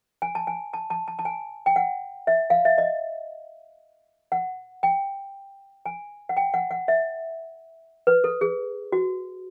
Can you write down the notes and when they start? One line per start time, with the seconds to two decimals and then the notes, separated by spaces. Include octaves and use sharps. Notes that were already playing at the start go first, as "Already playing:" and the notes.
0.22 G#5
0.35 A5
0.47 G#5
0.73 A5
0.90 A5
1.08 A5
1.19 A5
1.25 G#5
1.66 G5
1.76 F#5
2.27 E5
2.50 F5
2.65 E5
2.78 D#5
4.32 F#5
4.83 G5
5.86 G#5
6.29 F#5
6.37 G5
6.54 F#5
6.71 F#5
6.88 E5
8.07 B4
8.24 A4
8.41 G#4
8.92 F#4